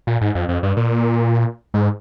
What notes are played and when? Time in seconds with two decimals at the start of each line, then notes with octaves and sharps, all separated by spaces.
0.07 A#2
0.21 G#2
0.35 F2
0.49 F2
0.63 G2
0.77 A#2
1.74 G#2